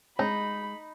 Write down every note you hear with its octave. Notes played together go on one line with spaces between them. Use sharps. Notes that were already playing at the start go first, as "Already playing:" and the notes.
G#3 C4 D4 D#4 C#5 B5